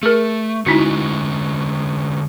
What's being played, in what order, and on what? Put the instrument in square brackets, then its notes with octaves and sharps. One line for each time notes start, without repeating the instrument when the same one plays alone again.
[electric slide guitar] A3 [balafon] G#4 A#4
[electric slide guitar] D3 G#3 C#4 [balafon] D#4 E4 F#4